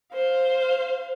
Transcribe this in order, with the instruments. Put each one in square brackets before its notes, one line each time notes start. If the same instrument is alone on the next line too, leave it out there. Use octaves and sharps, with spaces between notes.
[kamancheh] C5 F5